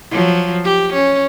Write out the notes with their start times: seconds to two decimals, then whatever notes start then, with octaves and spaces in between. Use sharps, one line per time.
0.11 F3 F#3
0.64 G4
0.93 C#4